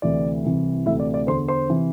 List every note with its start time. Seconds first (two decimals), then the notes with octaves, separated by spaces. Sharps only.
0.02 D2 C3 E3 D5
0.44 C2 C3 E3
0.86 D2 C3 E3 E4 E5
1.00 D5
1.14 D5
1.27 E2 D3 C5 C6
1.48 C5 C6
1.69 C3 E3